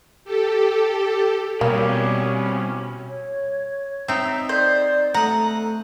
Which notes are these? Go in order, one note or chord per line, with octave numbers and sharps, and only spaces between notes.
G4 A4
B2 G3 A#3 C4 C#4 B4
C#5
C4 D#4 E5
C5 D5
A3 F#5 A#5 D#6